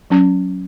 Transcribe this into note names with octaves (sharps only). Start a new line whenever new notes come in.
F#3 C#4